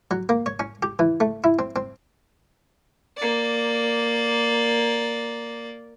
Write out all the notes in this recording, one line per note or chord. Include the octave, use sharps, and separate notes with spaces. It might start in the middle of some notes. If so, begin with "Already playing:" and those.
F#3
A#3
C#5
C#4
G4
E3
A3
E4
C4
C4
A#3 D5